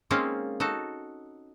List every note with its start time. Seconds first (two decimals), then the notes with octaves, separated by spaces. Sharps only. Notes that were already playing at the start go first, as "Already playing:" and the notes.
0.10 G#3 A#3 C4 C#4 D#4 F4
0.60 D#4 F#4 A4